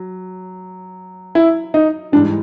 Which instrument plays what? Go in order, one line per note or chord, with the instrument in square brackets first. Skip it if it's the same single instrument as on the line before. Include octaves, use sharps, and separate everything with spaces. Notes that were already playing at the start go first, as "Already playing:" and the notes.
Already playing: [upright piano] F#3
[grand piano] E4
D#4
[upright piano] G#2 E3 G3 [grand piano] D4